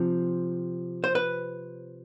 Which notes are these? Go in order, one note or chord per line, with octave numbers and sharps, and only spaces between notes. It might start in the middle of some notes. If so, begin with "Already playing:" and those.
Already playing: C3 F3
C5
B4